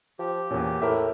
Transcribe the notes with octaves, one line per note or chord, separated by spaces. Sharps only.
F3 G4
E2 A#2 C#4
A2 A#4 B4 E5